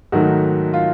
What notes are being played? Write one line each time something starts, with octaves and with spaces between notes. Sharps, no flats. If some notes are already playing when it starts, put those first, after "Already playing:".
G#2 D#3 F#3 A3 F#4
F4